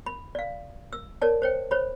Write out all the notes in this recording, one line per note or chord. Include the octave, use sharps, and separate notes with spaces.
B5
D5 F5
E6
A#4 C#5 D5 A5
C5 C#5 G5
C5 C#5 B5